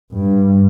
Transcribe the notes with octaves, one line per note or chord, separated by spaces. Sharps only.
G2